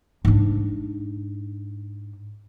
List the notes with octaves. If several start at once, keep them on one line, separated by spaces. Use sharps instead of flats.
G#2 D4